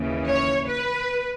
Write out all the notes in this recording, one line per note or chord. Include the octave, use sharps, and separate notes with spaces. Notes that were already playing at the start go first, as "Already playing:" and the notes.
Already playing: D#2 C#3 E3
C#5
B4